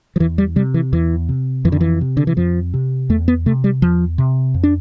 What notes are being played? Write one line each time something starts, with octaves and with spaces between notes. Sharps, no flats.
F3
E2 E3
G3
C3 G3
E3
E2 E3
C3
F2 E3
D3
E3
C3
D3
E3
F2 F3
C3
E2 A3
B3
C3 A3
G3
E2 F3
C3
F2
D4